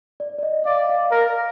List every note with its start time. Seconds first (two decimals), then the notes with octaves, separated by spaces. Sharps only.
0.20 D5
0.38 D5
0.43 D#5
0.65 D5 F5
0.89 F5
1.12 A#4